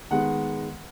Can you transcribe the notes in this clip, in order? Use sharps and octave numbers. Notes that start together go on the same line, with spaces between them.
D#3 G#3 B3 F#5